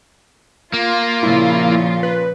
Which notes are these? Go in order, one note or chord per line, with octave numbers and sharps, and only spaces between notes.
A#3 F4
A#2 C#3 F3 E4
B4